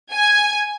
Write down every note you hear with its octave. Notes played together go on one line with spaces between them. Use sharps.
G#5